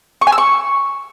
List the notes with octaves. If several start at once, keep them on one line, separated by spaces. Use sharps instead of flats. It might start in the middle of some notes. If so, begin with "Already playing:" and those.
C#6
G#5
E6
C#6